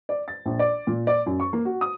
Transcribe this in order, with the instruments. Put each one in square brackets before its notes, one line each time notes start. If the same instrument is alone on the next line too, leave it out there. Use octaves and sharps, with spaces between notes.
[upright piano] D5
A6
A#1
D5
A#2
D5
F#2
C#6
A#3
F#4
D#6